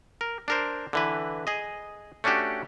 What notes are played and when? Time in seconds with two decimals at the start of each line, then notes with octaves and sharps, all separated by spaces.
0.21 A#4
0.48 D4 A#4 C5
0.93 D3 E3 B4
1.47 G#4 D#5
2.24 A3 C#4 D4 F#4 G4